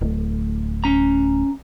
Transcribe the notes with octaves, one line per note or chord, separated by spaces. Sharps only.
D1 A3
C#4 A#5